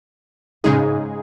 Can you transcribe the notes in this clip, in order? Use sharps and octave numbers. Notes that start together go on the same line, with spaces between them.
G#2 C#3 G#3 D#4 G#4